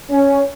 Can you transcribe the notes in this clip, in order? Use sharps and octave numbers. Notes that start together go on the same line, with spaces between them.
C#4